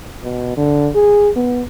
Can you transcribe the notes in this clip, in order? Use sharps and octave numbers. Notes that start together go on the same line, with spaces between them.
B2
D3
G#4
B3